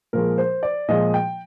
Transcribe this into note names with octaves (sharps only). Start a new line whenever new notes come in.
A#2 F3 G#3 A#4
C5
D5
A#2 F3 G#3 D#5
G5